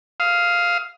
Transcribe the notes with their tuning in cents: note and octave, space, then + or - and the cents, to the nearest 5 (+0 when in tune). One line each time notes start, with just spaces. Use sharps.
F5 +0 D#6 +30